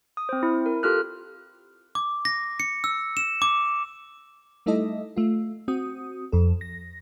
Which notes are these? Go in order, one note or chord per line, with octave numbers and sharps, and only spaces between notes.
D#6
C4 C5
E4
A#4
F4 G4 A4 F6 F#6
D6
A#6
C#7
E6
E7
D6
G3 A3 D#4 E4 A4 D#5
A3 F4
C4 F#4 D#6
F2 A4
A#6